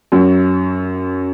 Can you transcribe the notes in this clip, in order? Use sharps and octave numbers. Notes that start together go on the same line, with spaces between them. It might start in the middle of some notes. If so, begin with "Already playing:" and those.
F#2 F#3